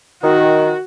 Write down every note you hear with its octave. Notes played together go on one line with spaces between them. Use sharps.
D#3 F#4